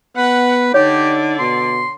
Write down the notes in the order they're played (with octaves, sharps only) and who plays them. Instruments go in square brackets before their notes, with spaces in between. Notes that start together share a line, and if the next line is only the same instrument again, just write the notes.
[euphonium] B3 [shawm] B4 [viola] F#5
[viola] D3 D5 [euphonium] D#4 [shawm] G4 [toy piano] C#5
[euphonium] B2 [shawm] C6